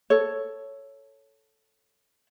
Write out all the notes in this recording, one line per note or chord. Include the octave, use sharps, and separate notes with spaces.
A4 C#5